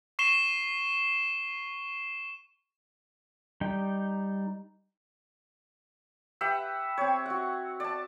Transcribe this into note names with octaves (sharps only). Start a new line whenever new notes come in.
C#6 C7 E7 G7
G3 D#4 G5
G4 B4 E5 F#5
C4 C#5
F#4 F#5
D5 A5